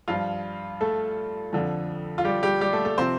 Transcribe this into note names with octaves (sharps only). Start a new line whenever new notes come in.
G2 F3 F4 F5
A3 A4
F2 D3 F3
F4
G3 G4
G3 G4
G3 G4
A3 A4
A3 A4
C3 F3 C4 C5